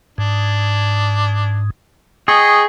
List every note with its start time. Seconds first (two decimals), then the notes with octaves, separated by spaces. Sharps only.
0.18 G#2 D4
2.28 G#4 D#5 G5 C#6